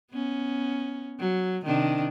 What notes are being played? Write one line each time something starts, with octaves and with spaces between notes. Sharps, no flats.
B3 C#4
F#3
C3 D#3 D4